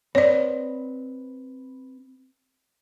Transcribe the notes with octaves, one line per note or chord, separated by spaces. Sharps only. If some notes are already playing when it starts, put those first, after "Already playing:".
C4 B4 C#5 D5